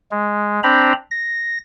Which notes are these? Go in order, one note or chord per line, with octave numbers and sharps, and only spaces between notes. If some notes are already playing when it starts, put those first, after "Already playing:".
G#3
C4 D4 C5 A#5 B5
A#6